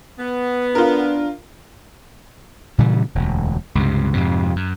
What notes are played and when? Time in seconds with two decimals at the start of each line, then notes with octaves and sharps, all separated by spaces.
0.18 B3
0.75 D4 F4 A#4
2.78 A#2 C#3 E3 G3
3.15 E1 D2
3.75 C#2 G2 C3
4.13 F2 G#2 C3
4.56 F#2